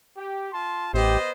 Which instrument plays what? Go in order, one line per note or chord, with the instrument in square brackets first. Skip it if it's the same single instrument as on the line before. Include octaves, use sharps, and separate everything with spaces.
[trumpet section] G4
F4 A5 C6
[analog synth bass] A1 [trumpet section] B3 C5 D#5 [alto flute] G4